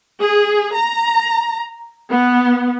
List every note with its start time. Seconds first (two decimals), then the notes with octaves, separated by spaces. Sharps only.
0.20 G#4
0.74 A#5
2.12 B3